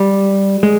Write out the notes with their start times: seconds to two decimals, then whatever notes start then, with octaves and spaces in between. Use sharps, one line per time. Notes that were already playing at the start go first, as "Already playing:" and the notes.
Already playing: G3
0.63 G#3